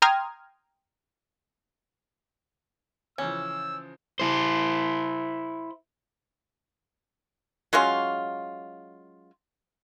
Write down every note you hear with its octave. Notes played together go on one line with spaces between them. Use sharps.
G5 A#5 C6 D#6 F6 G#6
C#3 E3 F3 C#4 E6
E4 C5
F#3 G#3 C#4 F4